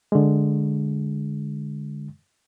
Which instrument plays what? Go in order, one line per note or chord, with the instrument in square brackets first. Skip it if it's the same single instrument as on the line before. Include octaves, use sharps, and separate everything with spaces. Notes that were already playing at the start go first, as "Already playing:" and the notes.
[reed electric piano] D3 G#3